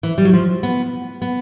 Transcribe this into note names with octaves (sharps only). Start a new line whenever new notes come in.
E3
G3
F#3
F3
B3
B3